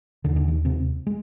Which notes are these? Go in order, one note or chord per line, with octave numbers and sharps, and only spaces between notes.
D#2 D3 D#3
D3
D#3
C3 C4
G#3